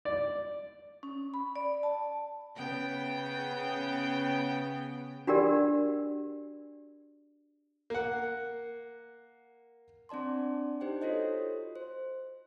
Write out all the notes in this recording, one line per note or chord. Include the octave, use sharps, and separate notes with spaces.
D5
C#4
B5
D5
A5
C#3 B3 G5
D4 F#4 G4 A#4 D5
A#3 F#5
C4 D4 D5 A5 C6
D#4 G4 C5 G5
F4 F#4 A4 C5 C#5 D#5
C5